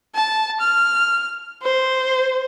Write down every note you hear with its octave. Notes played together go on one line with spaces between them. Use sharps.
A5
F6
C5